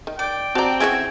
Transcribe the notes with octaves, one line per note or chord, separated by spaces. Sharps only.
D#3
D5 G5
C4 F#4 D5 A5 A#5
C#3 E3 F#4 E5 G#5